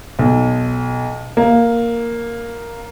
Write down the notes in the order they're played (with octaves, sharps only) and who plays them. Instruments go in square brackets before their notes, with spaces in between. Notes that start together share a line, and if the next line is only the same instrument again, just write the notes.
[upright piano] B1
A#3